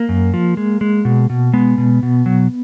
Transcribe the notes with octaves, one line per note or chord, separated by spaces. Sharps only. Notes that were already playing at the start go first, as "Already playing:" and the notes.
Already playing: A#3
F#2
F3
G#3
G#3
B2
B2
G#3 B3
B2
B2
F#3